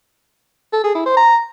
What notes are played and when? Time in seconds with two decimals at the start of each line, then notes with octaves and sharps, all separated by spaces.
0.73 A4
0.84 G#4
0.95 E4
1.06 C5
1.17 A#5